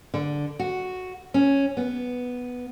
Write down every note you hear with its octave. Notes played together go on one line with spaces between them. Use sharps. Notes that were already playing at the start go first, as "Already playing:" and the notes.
D3
F#4
C#4
B3